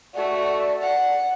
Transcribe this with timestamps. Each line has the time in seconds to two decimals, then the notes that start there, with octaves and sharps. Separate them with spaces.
0.14 A3 F#4 D5
0.82 F#5